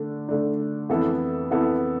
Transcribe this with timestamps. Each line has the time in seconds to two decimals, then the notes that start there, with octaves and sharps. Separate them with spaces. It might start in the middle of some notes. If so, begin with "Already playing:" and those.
Already playing: D3 A3 D4
0.29 D3 A3 D4
0.89 F2 E3 B3 E4 A4
1.51 F2 E3 B3 E4 A4